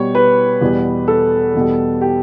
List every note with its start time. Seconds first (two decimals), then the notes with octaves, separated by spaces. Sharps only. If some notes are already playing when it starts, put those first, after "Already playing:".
Already playing: B2 G3 C#5
0.15 B4
0.61 E2 B2 G3
1.08 A4
1.54 E2 B2 G3
2.01 G4